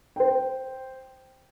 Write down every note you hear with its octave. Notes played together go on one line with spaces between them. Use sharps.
C5 G5